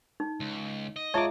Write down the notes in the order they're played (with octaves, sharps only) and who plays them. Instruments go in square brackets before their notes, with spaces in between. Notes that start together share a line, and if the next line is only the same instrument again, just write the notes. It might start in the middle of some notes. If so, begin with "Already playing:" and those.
[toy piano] D#4
[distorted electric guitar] C#2
D#5
[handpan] G#3 F4 [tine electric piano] C#5 D6 [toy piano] E5 A5 A#5